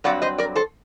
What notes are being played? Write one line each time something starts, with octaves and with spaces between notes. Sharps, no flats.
G2 F#3 C4 D5 F#5
C5 D#5
A#4 D5
A4 C5